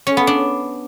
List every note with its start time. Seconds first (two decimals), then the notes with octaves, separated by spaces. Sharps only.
0.07 C#4
0.17 B3
0.27 D4